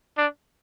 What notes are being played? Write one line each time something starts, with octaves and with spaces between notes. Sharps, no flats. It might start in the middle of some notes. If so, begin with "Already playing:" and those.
D4